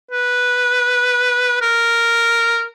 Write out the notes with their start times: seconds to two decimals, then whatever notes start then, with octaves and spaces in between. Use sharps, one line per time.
0.11 B4
1.61 A#4